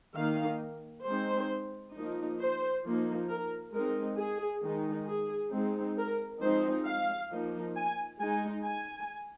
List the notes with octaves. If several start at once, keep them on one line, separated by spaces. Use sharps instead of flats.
D#3 A#3 D#4 F5
G#3 C4 D#4 C5
F3 A#3 D#4
C5
F3 A#3 D#4
A#4
G#3 C4 D#4 A#4
G#4
D#3 G#3 D#4
G#4
G#3 C4 D#4
A#4
F3 G#3 C4 D#4 C5
F5
F3 A#3 D#4
G#5
G#3 D#4 G#5
G#5